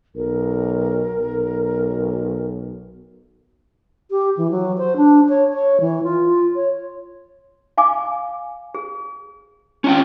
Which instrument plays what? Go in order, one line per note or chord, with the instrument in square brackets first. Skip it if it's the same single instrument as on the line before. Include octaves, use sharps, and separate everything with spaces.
[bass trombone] B1 [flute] A#4
[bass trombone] B1
[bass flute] G4
E3
F#3
C5
D4
C#5
C#5
E3
F4
C#5
[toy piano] F5 G#5 D6
G#4
[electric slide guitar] C#4 F4 G5